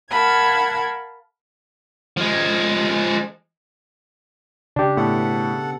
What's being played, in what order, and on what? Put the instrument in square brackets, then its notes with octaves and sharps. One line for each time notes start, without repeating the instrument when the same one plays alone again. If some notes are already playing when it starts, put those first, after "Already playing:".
[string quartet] A#4 F5 F#5 A5 B5 G#6
[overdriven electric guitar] F3 G#3
[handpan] C#3 [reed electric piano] D4 G4
[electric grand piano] A2 [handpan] B3 [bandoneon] A4 F#5